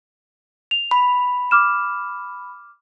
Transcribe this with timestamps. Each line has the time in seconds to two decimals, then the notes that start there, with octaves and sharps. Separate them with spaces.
0.71 F7
0.91 B5
1.51 D6 F6 E7